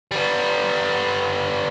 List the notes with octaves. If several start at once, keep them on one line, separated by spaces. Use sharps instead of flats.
G3 B3